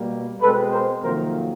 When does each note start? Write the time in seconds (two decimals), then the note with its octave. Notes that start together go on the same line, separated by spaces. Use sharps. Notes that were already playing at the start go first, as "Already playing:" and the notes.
Already playing: B2 G3 A#3
0.40 B2 G#3 C4 A4 B4
0.72 A#4 C5
1.02 F2 C3 D#3 F#3 A#3 A#4 C5